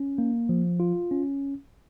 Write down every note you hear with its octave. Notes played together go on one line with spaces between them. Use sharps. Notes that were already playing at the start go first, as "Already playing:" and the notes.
Already playing: C#4
A#3
F3
F4
C#4